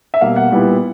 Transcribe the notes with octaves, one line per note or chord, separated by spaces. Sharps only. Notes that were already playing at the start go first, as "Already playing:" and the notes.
E5
B2 G3 A#3 F5
F#5
A#2 G3 B3 E4